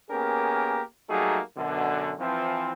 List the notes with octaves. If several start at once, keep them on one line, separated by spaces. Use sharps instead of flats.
A#3 B3 C#4 G4 G#4 A#4
F#3 G3 A3 A#3 D#4 G#4
F#2 B2 D3
E3 F3 C4